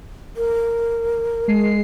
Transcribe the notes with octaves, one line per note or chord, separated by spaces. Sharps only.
A#4
G#3 C7